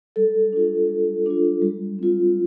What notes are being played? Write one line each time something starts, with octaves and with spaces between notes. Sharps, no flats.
G3 A4
D4 F4
G3
D4 F4
G3
C4 F4